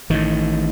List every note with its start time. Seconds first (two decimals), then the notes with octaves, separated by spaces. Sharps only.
0.10 A1 A2 D#3